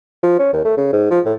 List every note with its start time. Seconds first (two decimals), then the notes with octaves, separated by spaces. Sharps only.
0.23 F3
0.39 C#4
0.53 D#2
0.65 A3
0.78 C#3
0.93 G#2
1.11 F3
1.25 A2